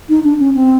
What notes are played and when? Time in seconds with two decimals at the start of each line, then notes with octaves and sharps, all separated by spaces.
0.09 D#4
0.24 D4
0.40 C#4
0.55 C4